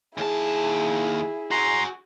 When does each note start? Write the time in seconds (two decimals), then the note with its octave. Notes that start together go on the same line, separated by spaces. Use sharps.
0.18 D#2 E4 G#4 A5
1.51 F#4 G#5 A#5 C6